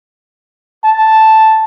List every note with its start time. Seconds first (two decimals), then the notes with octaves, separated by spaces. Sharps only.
0.84 A5